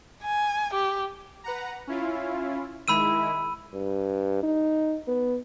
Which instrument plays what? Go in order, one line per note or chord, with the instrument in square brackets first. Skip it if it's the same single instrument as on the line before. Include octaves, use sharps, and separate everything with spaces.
[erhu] G#5
G4
[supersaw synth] B4 F#5 A#5
C#4 E4 F4
[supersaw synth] D#3 G#3 E4 [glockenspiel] B5 E6 D#7
[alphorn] G2
D#4
B3